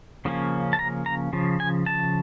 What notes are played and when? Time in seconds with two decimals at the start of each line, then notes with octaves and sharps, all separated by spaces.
0.25 C#3 F3 A#3 C#4
0.73 A5
0.79 A#5
1.06 A#5
1.33 C#3 F3
1.60 G#5
1.86 A5